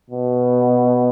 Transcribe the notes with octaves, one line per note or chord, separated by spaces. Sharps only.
B2